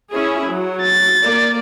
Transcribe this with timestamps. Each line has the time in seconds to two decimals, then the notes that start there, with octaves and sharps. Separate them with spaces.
0.12 C#4 E4 G#4
0.49 F#3
0.82 A6
1.23 A#3 D5